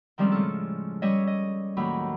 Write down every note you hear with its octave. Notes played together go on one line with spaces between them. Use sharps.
D#3 F3 G3 G#3 C4 C#4
A2 C#3 G#3 A4
G3 C#4 C#5 D#5 E5
D#5
D#2 A2 D#3 F#3 B5